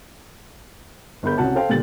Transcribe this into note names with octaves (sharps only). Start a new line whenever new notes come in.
G1 G#4 A#4 B5 G6
C2 C#4 F#4 F#5 A5
A4 C5 F5 G5
A#2 D3 G3 A6 F#7